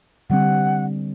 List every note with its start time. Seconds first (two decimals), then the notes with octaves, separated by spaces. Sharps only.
0.30 D3 G3 C4 F#5